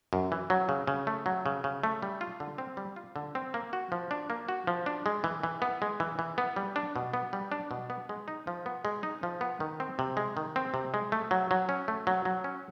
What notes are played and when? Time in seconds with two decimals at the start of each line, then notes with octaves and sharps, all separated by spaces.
0.13 F#2
0.32 E3
0.50 F#3
0.69 C#3
0.87 C#3
1.07 A3
1.26 F#3
1.46 C#3
1.64 C#3
1.84 A3
2.02 G3
2.21 F4
2.40 D3
2.58 C4
2.77 G3
2.96 F4
3.16 D3
3.35 C4
3.54 A#3
3.73 F#4
3.92 F3
4.11 D4
4.30 A#3
4.49 F#4
4.67 F3
4.86 D4
5.06 G#3
5.24 E3
5.43 E3
5.62 B3
5.82 G#3
6.00 E3
6.19 E3
6.38 B3
6.56 G3
6.76 D4
6.96 B2
7.14 B3
7.33 G3
7.52 D4
7.71 B2
7.90 B3
8.09 G#3
8.28 D#4
8.47 F3
8.66 B3
8.85 G#3
9.03 D#4
9.23 F3
9.41 B3
9.60 D#3
9.80 C4
9.99 C3
10.17 G#3
10.37 D#3
10.56 C4
10.74 C3
10.94 G#3
11.12 A3
11.31 F#3
11.51 F#3
11.69 C#4
11.88 A3
12.07 F#3
12.25 F#3
12.44 C#4